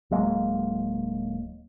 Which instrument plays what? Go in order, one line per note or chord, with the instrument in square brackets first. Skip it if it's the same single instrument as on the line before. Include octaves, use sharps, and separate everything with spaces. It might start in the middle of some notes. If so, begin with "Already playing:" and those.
[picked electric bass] D1 F#3 G#3 A#3